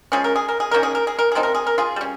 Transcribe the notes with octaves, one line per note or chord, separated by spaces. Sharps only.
F3 G#3 C#4 G#4
A#4
G#4
A#4
G#4
D#3 A#3 C#4 A#4
G#4
A#4
G#4
A#4
G#4
C3 F3 C4 D#4
A#4
G#4
A#4
F4 G#4
G3 C#4